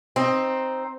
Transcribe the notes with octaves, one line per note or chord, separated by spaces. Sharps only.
C4 D#4